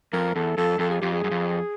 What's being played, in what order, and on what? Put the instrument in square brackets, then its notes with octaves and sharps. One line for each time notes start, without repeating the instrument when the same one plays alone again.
[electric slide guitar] F2 [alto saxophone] A#4
[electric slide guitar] E2 [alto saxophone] A4
[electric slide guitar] F2 [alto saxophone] A4
[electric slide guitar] F2 [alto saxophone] A4
[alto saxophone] G#4
[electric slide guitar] F2 [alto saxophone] G4
[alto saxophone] G#4
[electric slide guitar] F#2
F2